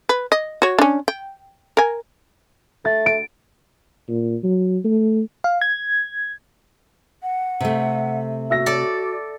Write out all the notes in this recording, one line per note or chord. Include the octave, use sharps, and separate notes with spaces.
B4
D#5
F#4 C#5
C#4 D4
G5
A#4 G#5
A3 A6
D7
A#2
F#3
A3
F5
G#6
F#5
C3 A3
F#4 E5 E6 A#6
A4 D5